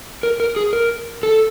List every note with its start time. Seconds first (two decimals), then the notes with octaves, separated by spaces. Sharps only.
0.23 A#4
0.40 A#4
0.56 G#4
0.73 A#4
1.23 A4